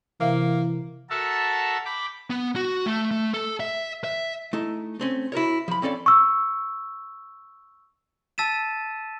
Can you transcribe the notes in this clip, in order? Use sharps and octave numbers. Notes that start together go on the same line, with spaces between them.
C3 E3 A#3 E5 F5
F#4 A4 A#4 E5 A5
G5 B5 D6
B3
F#4
A3
A3
A4
E5
E5
A3 D#4 E4
A3 C4 C#4
E4 F#4 A#4 C#5
F3 B5
C4 C#4 A4 D5 F5
C#6 E6
A5 E6 A6 B6 D#7 E7